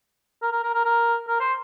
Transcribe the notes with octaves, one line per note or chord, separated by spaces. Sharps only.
A#4
A#4
A#4
A#4
A#4
A#4
C5